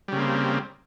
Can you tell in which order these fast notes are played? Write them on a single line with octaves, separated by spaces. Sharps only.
G3 C#3 A#3 C4